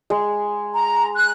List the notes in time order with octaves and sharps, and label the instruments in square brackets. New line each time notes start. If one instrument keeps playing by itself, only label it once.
[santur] G#3
[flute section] A#5
F#6